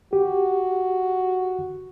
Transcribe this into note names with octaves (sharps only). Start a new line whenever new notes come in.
F#4 G4